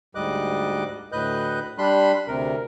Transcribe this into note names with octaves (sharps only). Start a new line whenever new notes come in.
D2 G#2 G3 D#5 D6 F#6
D2 A2 B4 D#5 F#6 G6
G3 D4 B5 C6 F#6
D2 C3 A#4